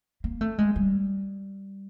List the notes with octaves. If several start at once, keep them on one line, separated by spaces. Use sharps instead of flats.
A#3
A3
G#3
G3